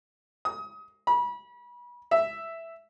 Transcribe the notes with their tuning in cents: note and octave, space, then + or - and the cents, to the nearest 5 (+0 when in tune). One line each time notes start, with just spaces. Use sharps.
D#6 +30
B5 -30
E5 +0